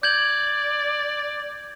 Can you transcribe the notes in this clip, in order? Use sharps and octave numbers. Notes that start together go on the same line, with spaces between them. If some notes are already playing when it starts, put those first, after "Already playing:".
D5 G6 G#6 F#7